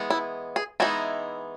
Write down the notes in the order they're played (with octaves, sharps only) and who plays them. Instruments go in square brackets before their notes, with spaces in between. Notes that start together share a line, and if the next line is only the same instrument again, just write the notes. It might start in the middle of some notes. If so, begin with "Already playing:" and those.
Already playing: [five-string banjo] E3 G#3 B3
E4
G#4
E3 G#3 B3 D#4 E4